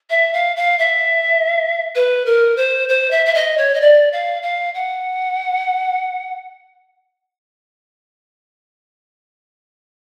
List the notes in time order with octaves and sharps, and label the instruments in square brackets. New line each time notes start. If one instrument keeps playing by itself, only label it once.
[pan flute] E5
F5
F5
E5
B4
A#4
C5
C5
E5
E5
D#5
C#5
D#5
D5
F5
F5
F#5